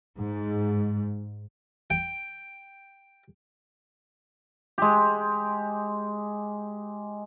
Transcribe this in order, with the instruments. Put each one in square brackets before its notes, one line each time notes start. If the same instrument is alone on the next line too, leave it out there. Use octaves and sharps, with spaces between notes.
[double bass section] G#2
[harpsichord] G5
[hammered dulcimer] G#3 G4